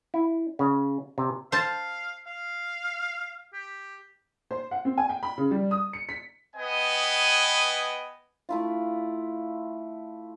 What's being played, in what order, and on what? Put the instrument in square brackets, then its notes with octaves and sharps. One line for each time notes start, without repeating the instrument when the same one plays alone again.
[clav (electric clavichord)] E4
C#3
C3
[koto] C5 A5 [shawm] F5
[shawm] F5
G4
[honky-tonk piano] C5
F#5
C4
G#5
G5
B5
C#3
G3
D#6
C#7
B6
[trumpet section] B3 B4 D#5 G5 G#5
[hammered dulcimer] A3 E4 F4